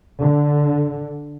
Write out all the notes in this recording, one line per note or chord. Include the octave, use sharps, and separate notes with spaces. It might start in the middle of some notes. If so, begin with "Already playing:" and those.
D3